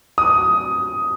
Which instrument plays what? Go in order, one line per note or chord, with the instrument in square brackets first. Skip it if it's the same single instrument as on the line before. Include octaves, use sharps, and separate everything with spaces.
[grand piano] D#6